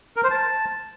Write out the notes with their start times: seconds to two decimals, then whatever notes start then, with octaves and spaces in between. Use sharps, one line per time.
0.16 A#4
0.23 C5
0.31 A5